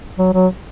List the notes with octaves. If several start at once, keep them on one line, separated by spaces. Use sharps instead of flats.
F#3
F#3